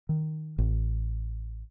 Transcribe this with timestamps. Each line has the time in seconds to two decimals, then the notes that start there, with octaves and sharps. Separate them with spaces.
0.09 D#3
0.58 A1